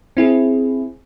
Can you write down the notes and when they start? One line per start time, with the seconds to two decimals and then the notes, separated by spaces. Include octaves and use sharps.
0.17 C4 E4 G#4